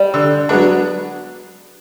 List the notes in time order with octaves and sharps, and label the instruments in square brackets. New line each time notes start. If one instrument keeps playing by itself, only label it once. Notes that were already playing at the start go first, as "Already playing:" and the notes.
Already playing: [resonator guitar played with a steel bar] G3
[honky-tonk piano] D3
F#3 B3 D4